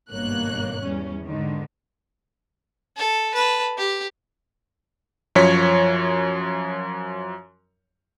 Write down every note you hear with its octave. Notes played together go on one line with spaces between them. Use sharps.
G#1 G2 B2 A#3 C#5 F#6
E2 G3 C#4
G#2 D3 D#3
A4
B4 A5
G4
F#2 F3 C#5 B6